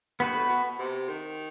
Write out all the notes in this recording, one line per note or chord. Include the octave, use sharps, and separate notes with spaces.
G2 B3 F#4 B4
A2
B2
C3
D#3